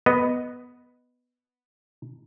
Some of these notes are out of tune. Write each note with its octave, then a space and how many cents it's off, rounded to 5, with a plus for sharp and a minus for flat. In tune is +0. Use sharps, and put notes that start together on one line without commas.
B3 +0 D#5 +0